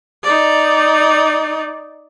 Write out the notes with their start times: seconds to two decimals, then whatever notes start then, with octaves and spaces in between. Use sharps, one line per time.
0.23 D#4 D5